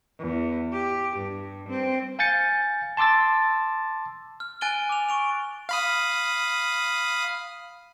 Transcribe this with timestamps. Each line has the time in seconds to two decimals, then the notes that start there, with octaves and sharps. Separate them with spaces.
0.20 E2
0.73 G4
1.17 G2
1.69 C4
2.19 F5 G#5 G6 A6 C#7
2.97 A5 C6 D6 E6 A6
4.40 F6
4.61 G#5 F#6 A6 D7 D#7 G7
4.89 D6 F7
5.09 C#6 D7 F7
5.69 F5 B5 D#6